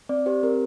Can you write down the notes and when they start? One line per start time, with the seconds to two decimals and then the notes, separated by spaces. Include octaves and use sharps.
0.09 C4 D5
0.26 G4 C5
0.43 C4 A#4